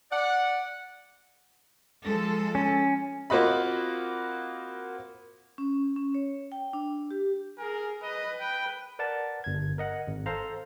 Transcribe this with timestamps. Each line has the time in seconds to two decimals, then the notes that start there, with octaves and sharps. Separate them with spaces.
0.12 D5 F#5
2.05 F3 G#3 A4
2.55 C#4
3.30 A#3 C4 F4 F#4 D#5 B5
5.58 C#4
5.96 C#4
6.15 C#5
6.52 G5
6.73 D4
7.11 G4
7.58 G#4 A#4
8.03 B4 D#5
8.40 G5
8.99 A#4 B4 D5 F#5 A5 A6
9.44 G1 G#6
9.78 A#4 D#5 F#5
10.07 G#1
10.26 A4 C5 F5 A#5